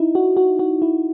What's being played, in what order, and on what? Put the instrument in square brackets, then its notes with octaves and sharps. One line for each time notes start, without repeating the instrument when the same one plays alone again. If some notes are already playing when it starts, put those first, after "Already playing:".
Already playing: [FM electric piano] D#4 E4
F#4
F#4
F#4
E4